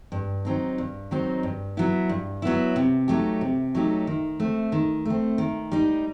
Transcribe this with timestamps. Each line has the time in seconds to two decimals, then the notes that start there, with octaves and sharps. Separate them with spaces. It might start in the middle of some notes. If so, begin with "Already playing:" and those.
0.12 G2
0.45 D#3 F#3 C4 D#4
0.78 G2
1.11 D#3 F#3 C4 D#4
1.43 G2
1.77 F#3 B3 E4
2.09 G2
2.42 F#3 B3 E4
2.76 C3
3.08 F#3 A3 D#4 G4
3.41 C3
3.75 F#3 A3 D#4 G4
4.07 D#3
4.40 A3 C4
4.72 D#3
5.05 A3 C4
5.38 D#3
5.71 G3 D#4